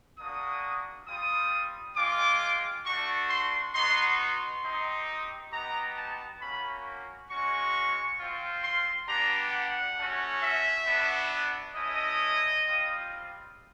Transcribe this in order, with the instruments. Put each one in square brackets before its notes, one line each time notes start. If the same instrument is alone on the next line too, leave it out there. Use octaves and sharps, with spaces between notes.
[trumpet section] A#3 D4 F#4 D#6
G3 C4 F4 D#6
G#3 C4 F4 D6
A3 D4 F#4 C#6
C6
B3 D#4 F#4 C6
C6
C4 D#4 G4
B3 D#4 G4 A#5
A5
A#3 C#4 F#4 B5
G#3 C#4 F#4 C#6
C4 F4
C6
B3 D4 G4 A#5
F#5
A3 C#4 F#4
E5
B3 D4 F#4
A3 C#4 E4 D#5
G3 C4 F4